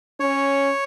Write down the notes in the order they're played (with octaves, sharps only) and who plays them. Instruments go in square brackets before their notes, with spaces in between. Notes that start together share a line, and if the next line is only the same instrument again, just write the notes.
[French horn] C#4 [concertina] C#5